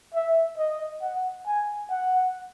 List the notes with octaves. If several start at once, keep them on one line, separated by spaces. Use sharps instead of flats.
E5
D#5
F#5
G#5
F#5